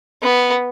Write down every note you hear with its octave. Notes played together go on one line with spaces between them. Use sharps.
B3